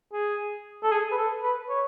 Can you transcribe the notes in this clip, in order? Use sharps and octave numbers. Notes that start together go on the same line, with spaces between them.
G#4
A4
G#4
B4
A4
B4
C#5